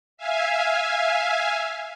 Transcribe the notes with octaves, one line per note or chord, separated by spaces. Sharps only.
E5 F5 G#5